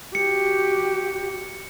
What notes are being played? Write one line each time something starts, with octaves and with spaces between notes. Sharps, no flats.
F#4 G4 C#7